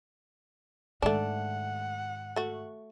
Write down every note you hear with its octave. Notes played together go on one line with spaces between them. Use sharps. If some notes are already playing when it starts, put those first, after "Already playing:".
G#2 D#3 A3 D4 F#5
A3 F#4